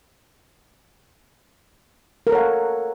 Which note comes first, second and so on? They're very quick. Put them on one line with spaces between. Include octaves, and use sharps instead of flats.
A#4 A4 C#5 F#5 F5